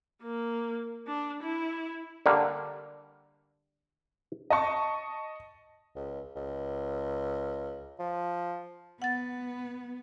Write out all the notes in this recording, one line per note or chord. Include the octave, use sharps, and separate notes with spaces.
A#3
D4
E4
D3 G3 A#3
D#5 A5 C#6
C#2
C#2
F3
B3 F#5 A6